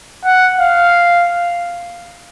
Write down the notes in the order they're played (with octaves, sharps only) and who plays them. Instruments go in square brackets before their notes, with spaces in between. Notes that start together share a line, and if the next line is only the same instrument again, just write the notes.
[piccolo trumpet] F#5
F5